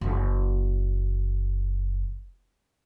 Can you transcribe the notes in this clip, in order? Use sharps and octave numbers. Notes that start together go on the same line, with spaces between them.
F#1 E3